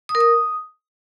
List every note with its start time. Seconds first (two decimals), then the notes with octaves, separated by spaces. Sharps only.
0.09 D#6
0.15 A#4
0.20 D#6